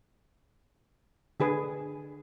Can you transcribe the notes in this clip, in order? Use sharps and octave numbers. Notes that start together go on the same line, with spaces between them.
D3 G#4 B4